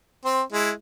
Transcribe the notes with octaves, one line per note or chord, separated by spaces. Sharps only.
C4 C5
G#3 E4